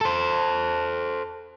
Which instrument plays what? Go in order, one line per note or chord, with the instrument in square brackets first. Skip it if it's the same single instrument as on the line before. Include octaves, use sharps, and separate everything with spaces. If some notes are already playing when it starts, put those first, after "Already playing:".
[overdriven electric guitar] A4 C5